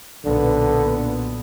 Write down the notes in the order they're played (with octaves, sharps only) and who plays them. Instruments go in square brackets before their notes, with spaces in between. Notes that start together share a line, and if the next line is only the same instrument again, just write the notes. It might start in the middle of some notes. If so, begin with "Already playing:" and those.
[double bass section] B1 A#2 B3 [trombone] D3